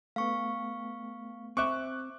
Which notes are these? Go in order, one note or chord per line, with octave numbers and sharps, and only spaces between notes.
A3 B3 F5 C#6
C4 E5 C#6 D6 F#6